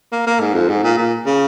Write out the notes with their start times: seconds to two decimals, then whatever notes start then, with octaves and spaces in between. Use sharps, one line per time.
0.12 A#3
0.26 A#3
0.40 G#2
0.54 F2
0.69 G#2
0.83 A#2
0.98 A#2
1.26 C#3